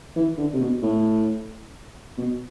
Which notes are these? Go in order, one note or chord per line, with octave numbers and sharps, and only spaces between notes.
E3
D3
C3
B2
A2
B2